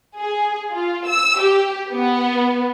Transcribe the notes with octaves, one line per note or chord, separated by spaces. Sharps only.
G#4
F4
E6
G4
B3